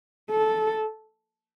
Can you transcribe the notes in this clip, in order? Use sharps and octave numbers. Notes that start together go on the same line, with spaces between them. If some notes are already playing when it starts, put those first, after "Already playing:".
A4